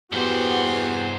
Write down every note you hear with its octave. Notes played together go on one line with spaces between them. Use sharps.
E2 G2 B3 F#4 G4 C5